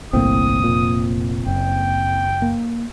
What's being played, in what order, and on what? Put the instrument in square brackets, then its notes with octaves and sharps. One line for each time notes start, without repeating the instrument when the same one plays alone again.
[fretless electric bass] G1 C2 A2 [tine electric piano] A#3 C4 [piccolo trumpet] D#6
[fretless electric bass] F1 A#2
[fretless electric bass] F#1 [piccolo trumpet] G5
[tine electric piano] A#3